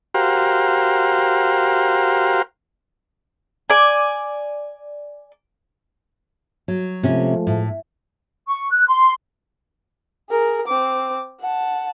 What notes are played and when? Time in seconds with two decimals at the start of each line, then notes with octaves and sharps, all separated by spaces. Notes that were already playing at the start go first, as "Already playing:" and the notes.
0.14 F#4 G4 A#4 C5 F5
3.70 D5 G#5
6.68 F#3
7.03 C3 F3 G#3 A3 C#4
7.47 A2
8.48 C#6
8.71 F#6
8.89 C6
10.30 G#4 A#4
10.68 C4 D6
11.41 F#5 A5